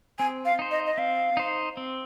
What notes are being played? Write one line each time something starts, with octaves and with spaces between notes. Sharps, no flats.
C4 G#5
F5
D#4 C5
D#5
D#5
C4 F5
D#4 C5
C4